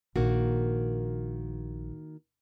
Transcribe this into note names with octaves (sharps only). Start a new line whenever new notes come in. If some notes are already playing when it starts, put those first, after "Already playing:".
A#1 D#3 A#3 F#4